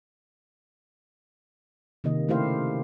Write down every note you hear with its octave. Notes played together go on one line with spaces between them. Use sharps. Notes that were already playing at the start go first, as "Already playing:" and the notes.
C3 D#3 A#3 D#5
C#3 A3 E4 G4 C5 F5